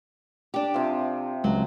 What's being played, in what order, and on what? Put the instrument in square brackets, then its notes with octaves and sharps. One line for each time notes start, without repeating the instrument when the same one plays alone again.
[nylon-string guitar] D4 G4
[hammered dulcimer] C3 F3
[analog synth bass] C#2 [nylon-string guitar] F#3